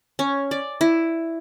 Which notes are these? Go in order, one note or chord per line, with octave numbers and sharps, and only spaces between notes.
C#4
D5
E4